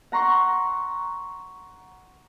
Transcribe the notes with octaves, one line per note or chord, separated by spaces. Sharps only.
F#5 A#5 C6 C#6